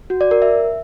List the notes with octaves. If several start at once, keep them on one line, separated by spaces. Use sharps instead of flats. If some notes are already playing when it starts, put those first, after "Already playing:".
F#4
D5
A#4
E5